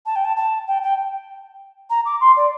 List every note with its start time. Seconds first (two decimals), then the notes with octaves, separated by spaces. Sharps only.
0.06 A5
0.16 G5
0.25 A5
0.37 A5
0.68 G5
0.83 G5
1.90 A#5
2.05 D6
2.21 C6
2.37 D5